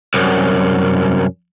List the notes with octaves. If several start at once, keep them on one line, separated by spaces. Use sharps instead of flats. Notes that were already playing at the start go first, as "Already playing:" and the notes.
C2 F#2